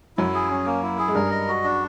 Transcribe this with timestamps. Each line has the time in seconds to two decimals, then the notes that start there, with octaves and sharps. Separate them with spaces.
0.17 F#2 F#3 E4
0.35 G#4
0.50 C#4
0.66 A#3
0.83 E4
0.99 G#4
1.08 G#3
1.15 G2 G3 A#4
1.31 D#5
1.48 F#4
1.64 D4